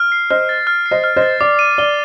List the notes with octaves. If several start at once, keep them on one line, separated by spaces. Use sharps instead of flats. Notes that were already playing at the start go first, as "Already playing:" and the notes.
Already playing: F6
C7
C5 D#5 F6
A6
F6
C7
C5 D#5
F6
C5 D#5
A6
D5 D6
D#7
D5 G7